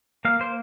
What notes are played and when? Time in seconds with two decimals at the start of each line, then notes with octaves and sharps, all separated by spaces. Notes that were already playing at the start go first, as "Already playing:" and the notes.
0.25 A#3 F5
0.40 A#3 C5